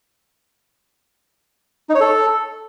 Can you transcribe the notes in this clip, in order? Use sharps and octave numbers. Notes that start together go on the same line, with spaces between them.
D#4
C#5
A4